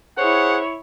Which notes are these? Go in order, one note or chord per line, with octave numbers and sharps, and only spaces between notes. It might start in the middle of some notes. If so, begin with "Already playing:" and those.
E4 G#4 C5 C#5 F#5